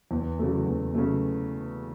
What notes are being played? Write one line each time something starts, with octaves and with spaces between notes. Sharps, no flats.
E2
C#3 F#3 A3
E2
C#3 F#3 A3